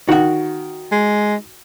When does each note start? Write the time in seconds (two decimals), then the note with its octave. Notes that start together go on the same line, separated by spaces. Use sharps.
0.09 D#3 F#4 F#5
0.92 G#3